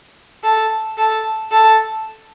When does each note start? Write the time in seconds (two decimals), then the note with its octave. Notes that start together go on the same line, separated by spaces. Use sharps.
0.44 A4
0.98 A4
1.51 A4